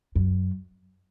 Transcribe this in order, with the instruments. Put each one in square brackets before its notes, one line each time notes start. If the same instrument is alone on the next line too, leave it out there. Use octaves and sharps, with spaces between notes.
[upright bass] F#2